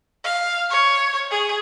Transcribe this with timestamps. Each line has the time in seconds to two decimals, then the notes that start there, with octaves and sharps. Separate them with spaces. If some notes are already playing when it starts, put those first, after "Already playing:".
0.24 F5
0.70 C#5
1.31 G#4